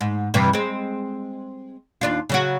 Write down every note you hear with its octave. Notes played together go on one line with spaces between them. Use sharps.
G#2
G2 C3 E3
G#3 C4
D#2 D4 F4
C#3 F#3 F#4